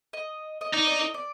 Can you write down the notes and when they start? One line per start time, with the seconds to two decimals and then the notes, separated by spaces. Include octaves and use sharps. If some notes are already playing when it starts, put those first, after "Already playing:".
0.13 D#5
0.61 D#5
0.73 D#4 D5
0.87 D5
1.01 D#5
1.14 D5